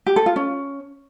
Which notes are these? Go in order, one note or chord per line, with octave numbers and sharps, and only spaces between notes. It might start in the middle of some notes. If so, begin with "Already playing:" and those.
G4
A4
F4
C#4